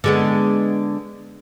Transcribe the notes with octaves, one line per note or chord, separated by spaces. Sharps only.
D3 G#3 B3